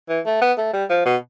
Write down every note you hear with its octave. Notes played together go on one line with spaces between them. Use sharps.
E3
A3
B3
A3
G3
F3
B2